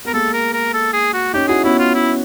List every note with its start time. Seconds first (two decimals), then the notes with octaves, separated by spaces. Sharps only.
0.05 B3 A#4
0.13 G#3 A#3 A4
0.33 A#4
0.54 A#4
0.74 A4
0.93 G#4
1.13 F#4
1.34 C#4 D#4 G4
1.48 E4 F#4 G#4
1.64 B3 C#4 E4
1.79 F4
1.94 E4